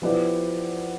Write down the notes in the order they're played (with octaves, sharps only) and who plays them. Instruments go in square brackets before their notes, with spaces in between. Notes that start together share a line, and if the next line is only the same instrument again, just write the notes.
[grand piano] F3 B3 E4 G4 D5